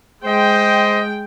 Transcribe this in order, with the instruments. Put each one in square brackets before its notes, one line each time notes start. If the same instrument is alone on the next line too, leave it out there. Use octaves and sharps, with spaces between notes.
[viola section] G#3 G5 [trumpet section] C5 D#5